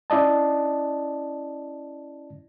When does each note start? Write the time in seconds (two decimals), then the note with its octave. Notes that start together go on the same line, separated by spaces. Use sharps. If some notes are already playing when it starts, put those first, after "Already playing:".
0.10 C#4 E4 D5 D#5 A5